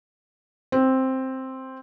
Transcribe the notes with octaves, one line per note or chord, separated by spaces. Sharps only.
C4